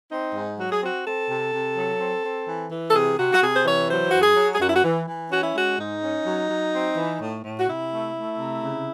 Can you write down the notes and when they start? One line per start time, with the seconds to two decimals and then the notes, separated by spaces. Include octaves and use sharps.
0.11 C4 D#4
0.35 G#2
0.59 F#3 F#4
0.71 G#4
0.82 C4 F#4
1.06 C4 A4
1.30 C3
1.53 C3
1.77 F#3
2.00 C4
2.24 C4
2.47 E3
2.71 E3
2.89 A4
2.95 C3 G#4
3.18 C3 F#4
3.33 F#4
3.42 C3 G#4
3.54 C5
3.65 E3 C#5
3.90 F#3 C5
4.10 F#2 F#4
4.21 G#4
4.36 F#3
4.52 G#4
4.60 F#2 F#4
4.68 E4
4.75 F#4
4.84 E3
5.07 E3
5.31 C#4 F#4
5.43 E4
5.55 G#3 F#4
5.78 G#2 D#4
6.02 C#4
6.26 F#3
6.50 F#3
6.74 C4
6.97 E3
7.21 A2
7.45 A2
7.59 F#4
7.68 C3 E4
7.91 A3
8.15 A3
8.39 C3
8.62 C#3